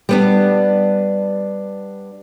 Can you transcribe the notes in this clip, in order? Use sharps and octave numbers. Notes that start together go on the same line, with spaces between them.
G3 B3 D4